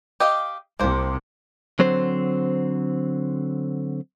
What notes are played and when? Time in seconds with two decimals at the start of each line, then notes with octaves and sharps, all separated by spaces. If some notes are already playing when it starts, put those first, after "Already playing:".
0.20 G4 D#5 F5
0.80 C2 C3 A#3 C5
1.79 D3 F#3 C4 C5